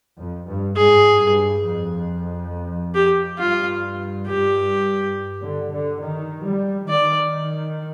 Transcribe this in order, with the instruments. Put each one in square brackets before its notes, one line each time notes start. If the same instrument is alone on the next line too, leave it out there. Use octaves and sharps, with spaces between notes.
[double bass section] F2
G2
[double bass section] G#2 [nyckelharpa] G#4
[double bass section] G2
F2
[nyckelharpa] G4
[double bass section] G2 [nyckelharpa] F4
[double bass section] G2 [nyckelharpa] G4
[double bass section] D3
D3
D#3
G3
[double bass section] D#3 [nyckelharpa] D5